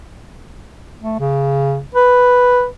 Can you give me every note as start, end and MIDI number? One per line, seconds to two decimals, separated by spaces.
1.02 1.19 57
1.20 1.80 49
1.95 2.66 71